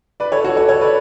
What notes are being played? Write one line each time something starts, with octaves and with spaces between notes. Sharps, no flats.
B4 D5
A4 C#5
F#4 A4
A4 C#5
A4 C#5
B4 D5